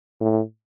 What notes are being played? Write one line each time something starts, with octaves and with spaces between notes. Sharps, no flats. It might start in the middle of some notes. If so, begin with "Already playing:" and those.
A2